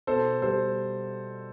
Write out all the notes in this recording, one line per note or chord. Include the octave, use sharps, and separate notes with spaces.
B2 A4 C5
G3 A4 C5